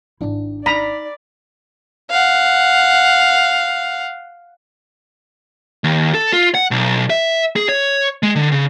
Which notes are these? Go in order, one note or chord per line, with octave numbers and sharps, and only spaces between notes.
G#1 G#2 D4 E4
D#4 D5 A#5 B5
F5 F#5
D#2
A4
F4
F#5
B1
E5
G#4
C#5
G#3
D3
C#3